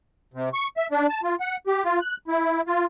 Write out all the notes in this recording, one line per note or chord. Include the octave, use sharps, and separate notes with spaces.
C3
C#6
E5
D4
A5
F4
F#5
G4
F4
F#6
E4
F4